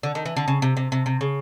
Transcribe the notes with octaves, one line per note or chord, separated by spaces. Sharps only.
D3
D#3
E3
D3
C#3
C3
C3
C3
C3
C#3